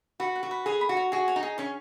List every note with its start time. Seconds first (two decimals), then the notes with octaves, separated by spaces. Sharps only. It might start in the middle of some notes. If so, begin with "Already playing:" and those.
0.20 F#4 B4
0.36 F#5
0.43 F#4
0.51 B4
0.66 G#4 C#5
0.81 B5
0.89 F#4
0.97 C#5
1.12 F#4 G#4
1.28 C#5
1.36 D#4
1.43 G#4
1.58 C#4 C#6